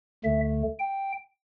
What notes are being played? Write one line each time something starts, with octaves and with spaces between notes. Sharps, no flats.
D2 D3 A3 E5
G5